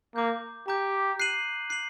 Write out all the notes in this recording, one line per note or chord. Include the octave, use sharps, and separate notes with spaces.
A#3 A#5 D6 G6
G4 A#5 D6 G6
F#6 C7 D#7 F#7
F#6 C7 D#7 F#7